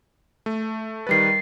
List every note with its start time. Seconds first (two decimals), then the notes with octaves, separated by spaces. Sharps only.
0.46 A3
1.07 D#3 G3 B4 A6 C7